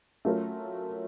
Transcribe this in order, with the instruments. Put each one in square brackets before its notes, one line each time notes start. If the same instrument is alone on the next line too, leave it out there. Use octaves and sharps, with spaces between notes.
[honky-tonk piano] F#3 A3 C#4 F4 A#4